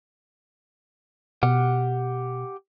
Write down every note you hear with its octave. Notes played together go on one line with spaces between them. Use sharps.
B2 G4 F#5 F6